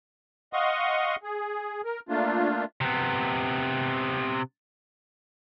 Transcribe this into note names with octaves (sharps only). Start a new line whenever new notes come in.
D#5 F5 F#5 C6 C#6 D#6
G#4
A#4
A3 A#3 D4 F4
C3 B3